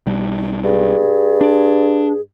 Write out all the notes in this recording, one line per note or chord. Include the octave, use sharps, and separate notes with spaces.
B1 G3
G2 G#4
D4